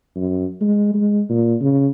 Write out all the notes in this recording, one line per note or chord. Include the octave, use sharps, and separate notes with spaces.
F#2
G#3
G#3
A#2
C#3